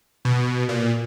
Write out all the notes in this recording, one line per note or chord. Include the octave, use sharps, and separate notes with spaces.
B2
A#2